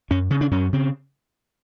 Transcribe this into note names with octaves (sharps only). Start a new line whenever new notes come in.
F#2 C#4
C#3 C#4
D4
F#2 C#4
C#3 C4